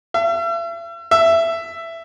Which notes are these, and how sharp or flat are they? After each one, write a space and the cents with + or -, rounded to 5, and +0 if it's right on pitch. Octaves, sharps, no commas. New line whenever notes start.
E5 +40
E5 +10